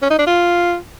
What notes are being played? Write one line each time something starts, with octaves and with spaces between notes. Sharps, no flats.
C#4
D#4
D4
F4